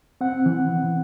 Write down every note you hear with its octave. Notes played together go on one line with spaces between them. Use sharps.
C4 F#5
E3